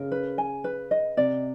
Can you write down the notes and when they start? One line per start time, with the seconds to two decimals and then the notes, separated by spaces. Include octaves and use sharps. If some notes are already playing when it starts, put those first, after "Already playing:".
Already playing: C#3 A#4
0.12 B4
0.38 G#5
0.64 B4
0.91 D#5
1.17 C3 D5